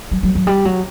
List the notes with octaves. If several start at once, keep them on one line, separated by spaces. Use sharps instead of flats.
F#3
F#3
F#3
G3
F#3